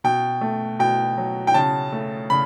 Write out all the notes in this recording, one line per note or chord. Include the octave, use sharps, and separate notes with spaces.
B2 G5
A3
B2 G5
F#3
G5
C#3 A5
A3
C#3 B5